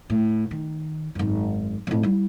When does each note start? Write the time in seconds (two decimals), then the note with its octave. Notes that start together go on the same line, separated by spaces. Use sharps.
0.10 A2
0.51 D#3
1.15 G#1 F#2
1.87 F2 A2
2.03 G3 E4